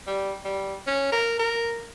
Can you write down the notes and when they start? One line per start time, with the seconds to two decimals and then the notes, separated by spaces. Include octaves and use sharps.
0.07 G3
0.45 G3
0.87 C#4
1.12 A#4
1.39 A#4